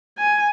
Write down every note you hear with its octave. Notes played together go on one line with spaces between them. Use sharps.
G#5